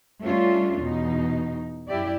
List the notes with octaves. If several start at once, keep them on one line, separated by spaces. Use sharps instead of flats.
G3 A3 C#4 D4 F4
E2 B2 D#4
F#2 E4 G4 D5